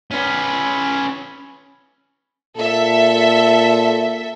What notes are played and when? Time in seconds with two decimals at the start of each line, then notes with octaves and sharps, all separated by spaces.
0.11 C#4 B4
2.58 A#2 A4 E5